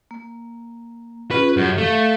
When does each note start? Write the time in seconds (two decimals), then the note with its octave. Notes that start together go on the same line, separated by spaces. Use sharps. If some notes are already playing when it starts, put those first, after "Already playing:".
0.11 A#3
1.31 C#4 F4 G#4 B4
1.57 F#2 G4
1.78 A3 F5